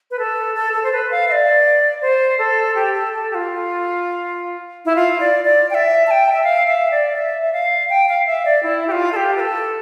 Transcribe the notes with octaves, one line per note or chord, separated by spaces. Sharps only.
B4
A4
A4
A4
C5
B4
F5
E5
D5
C5
A4
G4
A4
A4
G4
F4
E4
F4
D5
D5
G5
E5
A5
G5
E5
F5
E5
D5
E5
E5
F5
G5
F5
E5
D5
E4
G4
F4
A4
G4
B4
A4